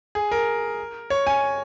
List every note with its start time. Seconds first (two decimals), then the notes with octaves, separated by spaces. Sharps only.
0.15 G#4
0.32 A#4
1.10 C#5
1.27 G#5